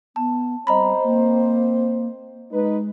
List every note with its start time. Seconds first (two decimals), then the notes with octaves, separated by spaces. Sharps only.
0.16 B3 A5
0.67 G3 C4 C5 D#5 A#5 B5
1.03 A#3
2.51 G#3 D#4 B4